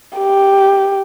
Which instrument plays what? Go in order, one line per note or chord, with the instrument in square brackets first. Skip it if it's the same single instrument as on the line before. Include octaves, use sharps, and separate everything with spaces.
[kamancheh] G4